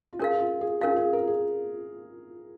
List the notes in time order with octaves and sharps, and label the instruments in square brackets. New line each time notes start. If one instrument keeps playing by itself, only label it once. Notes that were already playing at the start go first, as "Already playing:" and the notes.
[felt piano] F4
[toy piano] C#4 A#4 F5 [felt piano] G#4
[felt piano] F4
G#4
[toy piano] C#4 A#4 F5 [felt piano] G#4
[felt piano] F4
G#4
A#4
G#4